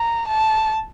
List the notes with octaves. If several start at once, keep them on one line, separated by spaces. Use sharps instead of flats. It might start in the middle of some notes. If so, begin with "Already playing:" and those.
Already playing: A#5
A5